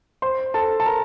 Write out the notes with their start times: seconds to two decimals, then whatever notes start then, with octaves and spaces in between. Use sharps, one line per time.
0.22 C5 C6
0.54 A4 A5
0.80 A5
0.86 A#4 A#5